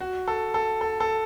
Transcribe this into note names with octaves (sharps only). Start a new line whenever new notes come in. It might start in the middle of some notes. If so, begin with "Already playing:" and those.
F#4
A4
A4
A4
A4